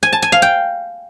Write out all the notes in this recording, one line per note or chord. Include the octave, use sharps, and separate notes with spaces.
G#5
A5
G#5
F5
G5